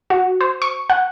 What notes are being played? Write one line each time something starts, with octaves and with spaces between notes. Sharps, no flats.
F#4
C5
C#6
F#5